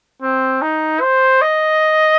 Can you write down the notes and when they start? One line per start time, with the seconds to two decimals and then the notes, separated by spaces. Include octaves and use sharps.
0.22 C4
0.62 D#4
1.01 C5
1.42 D#5